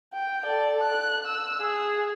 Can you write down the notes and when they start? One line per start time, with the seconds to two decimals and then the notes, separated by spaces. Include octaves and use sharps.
0.13 G5
0.45 A4 D5
0.83 F#6
1.26 E6
1.61 G#4